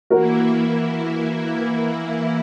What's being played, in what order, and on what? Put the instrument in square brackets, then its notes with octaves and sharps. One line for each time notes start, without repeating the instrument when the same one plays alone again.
[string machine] E3 A#3 E4 [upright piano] F#4 A#4